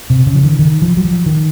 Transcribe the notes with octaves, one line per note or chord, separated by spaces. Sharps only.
C3
C#3
F3
D#3
D#3
F3
F#3
F3
D#3